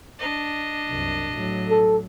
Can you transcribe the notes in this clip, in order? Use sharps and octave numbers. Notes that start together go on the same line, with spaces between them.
D4 D#5
C2 F#2
A2 F#3
A4